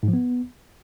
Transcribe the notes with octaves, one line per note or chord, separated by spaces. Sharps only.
G#2
F3
B3